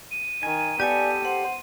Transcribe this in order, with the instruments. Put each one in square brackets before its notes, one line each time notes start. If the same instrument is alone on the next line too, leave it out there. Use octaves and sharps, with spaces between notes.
[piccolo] D#7
[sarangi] D#3 [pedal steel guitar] G#5
[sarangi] B3 [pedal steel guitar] G4 A4 [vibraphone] D5 G#5
[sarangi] C5 [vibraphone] F#5